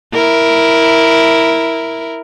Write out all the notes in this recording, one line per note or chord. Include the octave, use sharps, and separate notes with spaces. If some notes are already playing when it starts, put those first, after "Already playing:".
E4 A#4